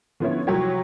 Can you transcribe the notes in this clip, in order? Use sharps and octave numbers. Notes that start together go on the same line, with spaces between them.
D3 F3 B3 C#4 E4 C#5
C2 F3 F#3 F#4 G4 C#5